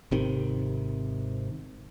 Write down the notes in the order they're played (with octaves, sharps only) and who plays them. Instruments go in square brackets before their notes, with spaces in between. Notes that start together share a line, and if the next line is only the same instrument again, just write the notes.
[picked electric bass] G#1 C3 D#3